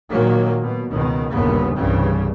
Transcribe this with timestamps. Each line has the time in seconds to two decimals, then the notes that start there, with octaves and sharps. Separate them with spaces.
0.12 A#2 D#3 F#3 A#3
0.62 B2
0.93 C#2 B2 D#3
1.34 G1 D#2 A#2 C#3 B3
1.77 C2 G2 C#3 E3 G3